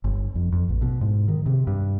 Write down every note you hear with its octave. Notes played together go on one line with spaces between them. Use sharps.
G1
F2
F2
A1
B2
G#2
D#3
C3
G2